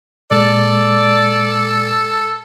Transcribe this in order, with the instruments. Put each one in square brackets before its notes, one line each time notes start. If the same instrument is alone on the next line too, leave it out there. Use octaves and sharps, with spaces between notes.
[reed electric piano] A#2 G#3 [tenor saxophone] A4 [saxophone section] D5